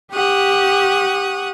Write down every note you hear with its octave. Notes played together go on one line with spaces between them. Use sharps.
G4 F#5 C#6 D#6